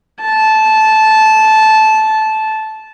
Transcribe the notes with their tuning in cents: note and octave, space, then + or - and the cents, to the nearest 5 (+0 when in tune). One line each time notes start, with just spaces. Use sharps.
A5 -15